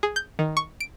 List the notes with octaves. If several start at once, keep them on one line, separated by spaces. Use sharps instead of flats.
G#4
G6
D#3
C#6
D7